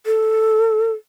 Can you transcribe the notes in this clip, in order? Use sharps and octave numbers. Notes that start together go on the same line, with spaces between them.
A4